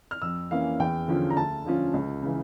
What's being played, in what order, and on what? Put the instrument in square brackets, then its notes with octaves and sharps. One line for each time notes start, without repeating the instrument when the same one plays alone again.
[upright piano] F6
F2 E6
E3 A#3 C#4 F5
E2 G5
D3 F3 C#4 F4
A#5
D2 A5
D3 F3 C#4 F4
C#2
C#3 E3